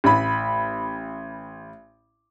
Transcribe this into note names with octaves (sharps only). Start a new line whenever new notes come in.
A1 B5